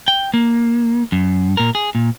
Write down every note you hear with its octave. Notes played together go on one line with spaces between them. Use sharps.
G5
A#3
F#2
A#2 A#4
G#4
A#2